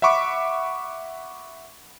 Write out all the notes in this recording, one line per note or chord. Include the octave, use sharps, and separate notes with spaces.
E5 F#5 B5 C#6 D6